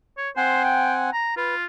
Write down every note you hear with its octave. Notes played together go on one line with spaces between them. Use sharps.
C#5
C4 C5 F#5 G#5
G5
A#5
F4 B4